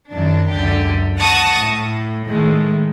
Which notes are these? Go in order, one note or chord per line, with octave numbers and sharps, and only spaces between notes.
F#2 D#3 D4
C#2 F#2 D3 G4
F#5 A5 C#6 D#6 A#6
A2
A2 D#3 G#3 A3